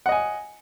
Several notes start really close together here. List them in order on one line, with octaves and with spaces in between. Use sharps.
F#5 D#5 G#5